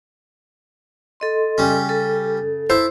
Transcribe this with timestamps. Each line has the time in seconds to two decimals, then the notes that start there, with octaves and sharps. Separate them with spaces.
1.20 A4 D#5 C6
1.58 C#3 G3 C#4
1.89 A4
2.70 E4 C5 A5